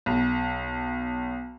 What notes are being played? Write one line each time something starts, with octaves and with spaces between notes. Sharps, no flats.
B1